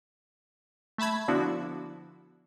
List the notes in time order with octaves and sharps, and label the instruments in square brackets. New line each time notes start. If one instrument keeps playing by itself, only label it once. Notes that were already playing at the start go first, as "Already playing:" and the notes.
[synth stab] A3 E5 A5 B5 G#6
D3 F3 B3 D4 E4 F#4